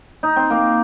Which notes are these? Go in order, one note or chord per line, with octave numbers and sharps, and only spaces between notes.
D#4
C4
A#3